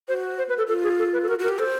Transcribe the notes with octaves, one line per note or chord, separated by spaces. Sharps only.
F#4 C5
C5
B4
A4
F4 A4
G#4
A4
B4
A4
F#4 A#4
F#4 A#4
G4
A4 C5